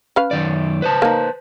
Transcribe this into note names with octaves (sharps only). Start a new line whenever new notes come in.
C#4 B4 F5
F#2 D#3 D5
B4 C5 A5
A#3 D#4